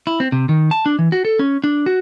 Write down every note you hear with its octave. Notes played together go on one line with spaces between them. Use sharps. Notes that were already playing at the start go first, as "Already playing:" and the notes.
E4
C4
C3
D#3
A5
D4
E3
F#4
A4
C#4
D4
F#4